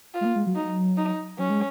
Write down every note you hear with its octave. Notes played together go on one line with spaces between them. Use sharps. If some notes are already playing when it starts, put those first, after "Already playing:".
F4
G#3
A#3
G#3
F#3
D#4
D#4
F#3 C#4
G#3